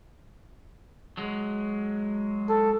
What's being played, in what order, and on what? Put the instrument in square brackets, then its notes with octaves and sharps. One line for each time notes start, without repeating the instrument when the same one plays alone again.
[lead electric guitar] F#3 G#3
[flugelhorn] A4